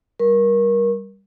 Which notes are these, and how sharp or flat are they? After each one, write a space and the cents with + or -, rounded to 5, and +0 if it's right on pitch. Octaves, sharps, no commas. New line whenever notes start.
G3 +0 A#4 +25 C#6 -30